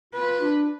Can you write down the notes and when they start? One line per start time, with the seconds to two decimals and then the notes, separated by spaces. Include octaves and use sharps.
0.14 F4 B4
0.41 D4